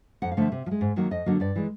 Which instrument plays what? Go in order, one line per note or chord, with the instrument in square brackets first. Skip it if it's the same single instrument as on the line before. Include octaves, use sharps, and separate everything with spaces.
[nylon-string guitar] F2 F#5
F5
D3 F3 A3 E5
C3
F3
G#3
G#2
D#3 F#3 A#3
F2 D#5
D3 F#3 A#3
G2 D5
E3 G#3